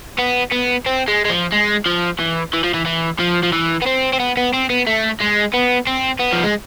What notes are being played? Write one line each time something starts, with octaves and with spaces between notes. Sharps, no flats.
B3
B3
C4
G#3
G#3
F3
G#3
F3
E3
E3
F3
E3
E3
F3
F3
E3
B3
C4
C4
B3
B3
C4
B3
A3
G#3
B3
C4
B3
F3
G#3